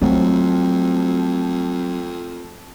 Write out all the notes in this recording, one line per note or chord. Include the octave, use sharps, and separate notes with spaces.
F2 F#3 A3 C4